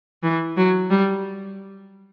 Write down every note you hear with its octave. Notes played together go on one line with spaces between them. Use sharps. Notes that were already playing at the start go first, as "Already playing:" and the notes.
E3
F#3
G3